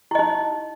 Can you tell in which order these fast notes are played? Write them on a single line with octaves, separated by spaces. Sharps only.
E4 D#5 D#4